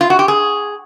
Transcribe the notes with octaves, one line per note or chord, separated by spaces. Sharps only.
F4
F#4
G4
G#4